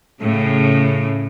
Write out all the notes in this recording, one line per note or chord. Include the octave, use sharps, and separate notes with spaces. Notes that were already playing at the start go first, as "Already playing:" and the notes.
A2 C#3